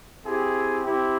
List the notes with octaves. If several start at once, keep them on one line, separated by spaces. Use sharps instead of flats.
C4 E4 G4 G#4
C4 E4 G4